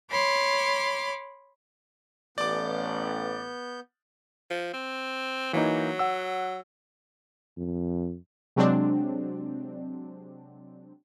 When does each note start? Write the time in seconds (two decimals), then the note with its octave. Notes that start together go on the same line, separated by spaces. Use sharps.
0.10 C#5 B5 C6 D6
2.38 A1 B3 D5 D6 G6
4.50 F3
4.73 C4
5.53 E3 F#3 A#3 D#4
5.99 F#5 E6
7.57 F2
8.56 C3 F#3 G#3 C4 D4